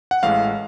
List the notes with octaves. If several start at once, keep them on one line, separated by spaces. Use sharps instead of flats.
F#5
A1 A2 E3 G#3 F5